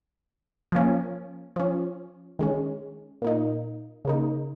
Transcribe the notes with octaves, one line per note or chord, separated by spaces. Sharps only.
F3 A#3 C#4
F3 C#4
D#3 G#3 C#4
A#2 A#3 D#4
C#3 A#3 D#4